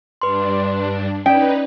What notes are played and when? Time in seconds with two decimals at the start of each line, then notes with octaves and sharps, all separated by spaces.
0.22 G2 D4 B4 C6
1.26 C#4 D#4 B4 D5 G5